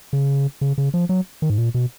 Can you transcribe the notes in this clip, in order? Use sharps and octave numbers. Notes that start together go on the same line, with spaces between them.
C#3
C#3
C#3
F3
F#3
D#3
G#2
A#2
B2